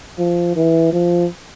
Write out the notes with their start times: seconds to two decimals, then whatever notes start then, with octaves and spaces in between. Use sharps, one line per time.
0.18 F3
0.55 E3
0.92 F3